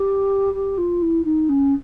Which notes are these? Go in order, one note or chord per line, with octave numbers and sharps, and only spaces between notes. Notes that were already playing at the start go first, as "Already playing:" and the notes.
Already playing: G4
G4
F4
E4
D#4
C#4